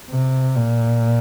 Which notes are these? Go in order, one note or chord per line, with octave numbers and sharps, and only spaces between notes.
C3
A#2